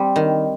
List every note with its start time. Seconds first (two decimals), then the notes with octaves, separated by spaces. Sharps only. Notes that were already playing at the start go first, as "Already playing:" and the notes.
Already playing: G3 C4
0.16 D#3